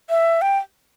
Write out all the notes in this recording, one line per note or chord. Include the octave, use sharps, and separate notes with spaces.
E5
G5